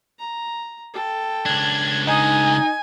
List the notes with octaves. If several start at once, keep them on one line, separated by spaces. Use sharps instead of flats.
A#5
A4 G5
C#2 D4 G#6
D#4 G#5 D#6